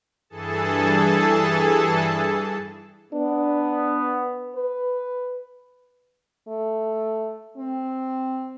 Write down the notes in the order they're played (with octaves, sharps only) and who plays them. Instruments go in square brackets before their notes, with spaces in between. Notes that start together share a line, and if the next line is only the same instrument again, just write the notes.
[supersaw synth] G2 E3 G#4 A4 A5
[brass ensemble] B3 [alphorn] D4
[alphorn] B4
A3
C4